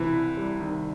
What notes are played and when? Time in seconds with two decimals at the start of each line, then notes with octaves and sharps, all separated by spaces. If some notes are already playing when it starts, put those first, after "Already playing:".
Already playing: C3 E3
0.13 C2
0.37 G3
0.60 D#3